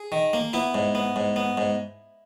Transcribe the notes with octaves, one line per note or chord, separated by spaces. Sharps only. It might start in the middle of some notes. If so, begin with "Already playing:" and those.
Already playing: G#4
D#3
A#3
B3 E4
G#2
B3
G#2
B3
G#2